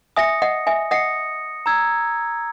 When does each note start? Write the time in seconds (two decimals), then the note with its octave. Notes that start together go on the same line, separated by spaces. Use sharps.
0.17 E5 G#5 D#6 A#6 C#7
0.42 D#5 F#5
0.67 E5 G#5
0.91 D#5 F#5 D#6 A#6 C#7
1.66 A#5 E6 G#6